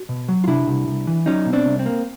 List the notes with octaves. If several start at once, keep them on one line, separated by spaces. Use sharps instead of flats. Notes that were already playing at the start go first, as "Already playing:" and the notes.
Already playing: F#4
B2
F#3
F4
C3 D4 E4
C2
C2
E3
F#3 C#4 D#4
B2
C4 D4
C2
C4
A#3